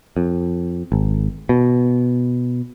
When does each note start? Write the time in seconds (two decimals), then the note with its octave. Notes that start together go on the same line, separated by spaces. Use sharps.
0.17 F2
0.92 G#1
1.49 B2